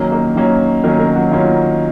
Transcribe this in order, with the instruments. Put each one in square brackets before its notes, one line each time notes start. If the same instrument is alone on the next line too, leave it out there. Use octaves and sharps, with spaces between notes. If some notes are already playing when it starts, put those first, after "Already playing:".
Already playing: [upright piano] D#3 F#3 A#3 C#4
A#3 A#4
D#3 F#3 A#3 C#4
D#3 F#3 A#3 C#4 A#4
A#3 A#4
F#3 F#4
D#3 F#3 A#3 C#4 F4